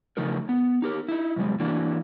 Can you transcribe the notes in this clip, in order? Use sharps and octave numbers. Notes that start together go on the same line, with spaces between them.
C#3 F3 A3 D#4 A#4
B3
D#4 G4 A#4
D#4 E4
F#2 C3 G3 G#3
E3 A#3 D4 F#4